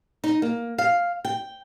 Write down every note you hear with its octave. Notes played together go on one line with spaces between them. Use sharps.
D#4
A#3
F5
G5